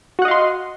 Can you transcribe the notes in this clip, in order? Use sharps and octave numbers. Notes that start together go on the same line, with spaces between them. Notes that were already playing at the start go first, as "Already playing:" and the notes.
F#4 D#5 F5 F#5 C6